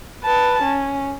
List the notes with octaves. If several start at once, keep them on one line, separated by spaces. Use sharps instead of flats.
B4 A5
C#4